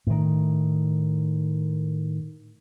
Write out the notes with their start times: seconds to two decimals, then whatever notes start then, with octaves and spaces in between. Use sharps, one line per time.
0.07 A2 D#3